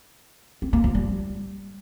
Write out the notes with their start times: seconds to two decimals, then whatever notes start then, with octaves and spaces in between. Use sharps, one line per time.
0.62 C4
0.73 A#3
0.84 F3
0.95 G3